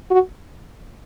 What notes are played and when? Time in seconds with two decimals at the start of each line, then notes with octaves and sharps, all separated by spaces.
0.11 F#4